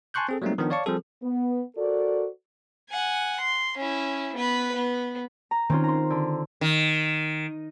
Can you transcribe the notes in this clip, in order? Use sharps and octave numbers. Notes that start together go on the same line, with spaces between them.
G#5 A5 C6 C#6 F#6 G6
C4 G#4 A4
F#3 G3 A3 A#3 C4 D#4
D#3 F3 B3 D4
C#5 D5 F5 A5 C#6
F3 G3 C4 G#4 A4
B3
F#4 A4 A#4 C5 D5
F#5 G#5
C6
C#4 E4
B3 B4
B3
A#5
D#3 C4 C#4 F4
A#5 C6
D3
D#3